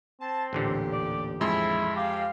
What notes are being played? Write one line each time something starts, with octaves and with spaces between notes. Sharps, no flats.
C4 A5
A1 D#2 A#2 D3 G4
D5
F2 G#3 E4 C6
G4 F5